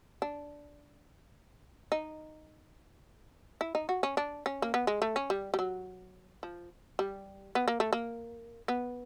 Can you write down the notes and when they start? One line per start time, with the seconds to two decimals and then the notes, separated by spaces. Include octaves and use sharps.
0.22 D4
1.92 D#4
3.61 E4
3.75 D#4
3.89 F#4
4.03 C#4
4.17 D4
4.46 C#4
4.62 A#3
4.74 B3
4.87 G#3
5.02 A3
5.16 C#4
5.30 G3
5.54 G3
5.59 F#3
6.43 F3
6.99 G3
7.55 B3
7.68 A#3
7.80 A3
7.93 A#3
8.68 B3